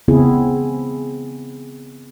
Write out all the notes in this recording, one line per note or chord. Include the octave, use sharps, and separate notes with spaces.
C#3 B3 C4 E4 G#4